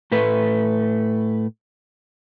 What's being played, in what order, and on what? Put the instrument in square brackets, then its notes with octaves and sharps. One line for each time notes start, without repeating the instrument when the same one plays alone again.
[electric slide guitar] A2 A3 B4